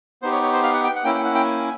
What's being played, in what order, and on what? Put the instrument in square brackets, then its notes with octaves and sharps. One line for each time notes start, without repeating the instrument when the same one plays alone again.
[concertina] B3 D#4 G4 C5
C#5
C#5
C5
F5
F#5
G5
F#5
A#3 C#4 E4 G5
G5
F#5
G5
G#5